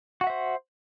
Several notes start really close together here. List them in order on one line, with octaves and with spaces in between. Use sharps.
F#4 F#5 E5 C5